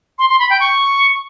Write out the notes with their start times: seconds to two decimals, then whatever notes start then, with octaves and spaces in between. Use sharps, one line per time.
0.19 C6
0.29 C6
0.39 B5
0.50 G5
0.60 C#6